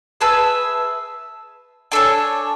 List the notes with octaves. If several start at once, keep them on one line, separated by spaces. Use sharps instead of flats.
G#4 B4 E5 A5
D4 A4 C#5 G#5